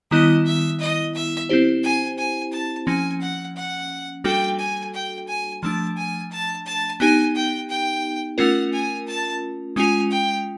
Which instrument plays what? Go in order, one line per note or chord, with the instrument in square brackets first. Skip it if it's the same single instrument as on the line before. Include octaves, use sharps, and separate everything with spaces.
[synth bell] D#3 G3 B3 E4 [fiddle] D#5
[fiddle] E5
D#5
E5
[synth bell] C4 E4 G4 C5
[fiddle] G#5
G#5
A5
[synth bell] F3 A#3 C#4 [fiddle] G#5
[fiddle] F#5
F#5
[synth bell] G3 A#3 D4 F#4 A4 [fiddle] G5
[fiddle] G#5
G5
G#5
[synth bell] F3 A3 D4 [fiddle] A5
[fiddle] G#5
A5
A5
[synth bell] B3 D#4 G4 [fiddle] G#5
[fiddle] G5
G5
[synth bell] A3 C#4 F4 A#4 [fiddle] F#5
[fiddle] G#5
A5
[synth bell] G#3 C#4 F4 [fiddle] G#5
[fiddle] G5